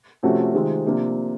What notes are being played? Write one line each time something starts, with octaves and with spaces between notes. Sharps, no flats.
C3 F3 A3 C#4 F#4
C3 D#3 G#3 C4 F4
C3 F3 A#3 D4